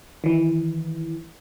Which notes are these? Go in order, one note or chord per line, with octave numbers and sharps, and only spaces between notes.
D#3 E3